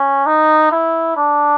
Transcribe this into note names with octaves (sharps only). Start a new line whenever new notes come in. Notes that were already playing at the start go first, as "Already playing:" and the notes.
Already playing: C#4
D#4
E4
D4